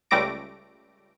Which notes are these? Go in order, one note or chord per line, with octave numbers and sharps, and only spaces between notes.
C#2 G3 A3 D6 A#6 D7